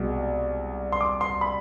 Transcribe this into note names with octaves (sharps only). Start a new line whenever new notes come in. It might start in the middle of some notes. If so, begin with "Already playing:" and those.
Already playing: C2 B2 G#3
C6
D6
C6
B5